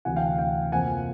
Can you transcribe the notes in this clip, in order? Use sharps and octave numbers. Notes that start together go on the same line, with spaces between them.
D2 C3 E3 F#5 G#5
F5 G5
F5 G5
F2 C3 F3 A#3 F#5 G#5